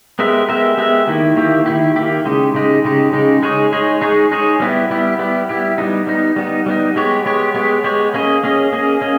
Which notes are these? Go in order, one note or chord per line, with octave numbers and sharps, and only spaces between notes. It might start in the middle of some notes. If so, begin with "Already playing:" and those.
G#3 B3 G4 A#4 E5
G#3 B3 G4 A#4 E5
G#3 B3 G4 A#4 E5
D#3 A#3 E4 G4
D#3 A#3 E4 G4
D#3 A#3 E4 G4
D#3 A#3 E4 G4
C#3 G#3 D#4 G4
C#3 G#3 D#4 G4
C#3 G#3 D#4 G4
C#3 G#3 D#4 G4
G#3 D#4 G#4 C#5
G#3 D#4 G#4 C#5
G#3 D#4 G#4 C#5
G#3 D#4 G#4 C#5
G3 B3 E4 G4
G3 B3 E4 G4
G3 B3 E4 G4
G3 B3 E4 G4
G3 B3 D#4
G3 B3 D#4
G3 B3 D#4
G3 B3 D#4
G#3 B3 G4 C#5
G#3 B3 G4 C#5
G#3 B3 G4 C#5
G#3 B3 G4 C#5
A#3 C#4 G#4 D#5
A#3 C#4 G#4 D#5
A#3 C#4 G#4 D#5
A#3 C#4 G#4 D#5